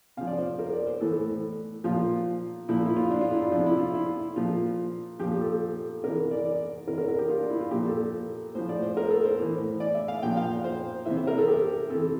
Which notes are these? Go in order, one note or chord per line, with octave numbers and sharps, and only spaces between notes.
C3 F3 F5
D5
C5
A#4
D5
C5
A2 E3 A4
A#2 F3 F4
A#2 F3 E4
E4
F4
D4
F4
E4
D4
C3 F3 D4
E4
F4
E4
A#2 F3 F4
A#2 F3 G4
A4
C3 E3 A#4
D5
D5
C3 E3 A#4
A#4
A#4
G4
F4
D4
E4
F4
A#2 F3 G4
A4
A2 F3 C5
D5
C5
A#4
A4
C5
A2 E3
D5
E5
F5
A#2 F3 G5
F5
C5
C3 E3 E5
C5
A#4
A4
G4
C3 E3 A4